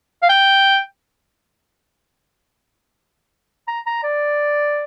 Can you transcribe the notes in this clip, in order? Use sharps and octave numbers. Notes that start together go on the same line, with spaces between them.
F5
G5
A#5
A#5
D5